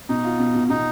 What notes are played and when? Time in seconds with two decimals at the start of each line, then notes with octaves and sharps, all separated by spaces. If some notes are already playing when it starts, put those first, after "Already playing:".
0.09 B2 D#4
0.24 F4
0.39 B2
0.54 B2
0.69 B2 D#4